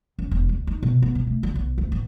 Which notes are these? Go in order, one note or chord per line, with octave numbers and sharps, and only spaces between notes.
F#2
E1
D2
D#4
B2
B3
B2
A3
D3
B1
D2
A1